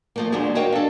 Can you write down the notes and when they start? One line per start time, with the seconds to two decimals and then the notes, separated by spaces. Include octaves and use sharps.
0.16 F3 A3 A#3
0.32 D#2 F#3 G#3 D4 G#4
0.55 F#4 A#4 C#5 D#5 F5 G5
0.72 D4 A4